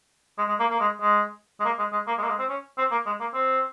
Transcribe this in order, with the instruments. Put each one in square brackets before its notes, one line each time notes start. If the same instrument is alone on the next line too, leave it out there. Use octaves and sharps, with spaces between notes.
[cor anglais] G#3
G#3
A#3
A#3
G#3
G#3
G#3
A#3
G#3
G#3
A#3
G#3
A#3
G#3
C4
C#4
C4
A#3
G#3
A#3
C4